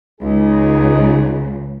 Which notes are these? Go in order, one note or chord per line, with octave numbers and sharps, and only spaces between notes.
C#2 D#4 G#4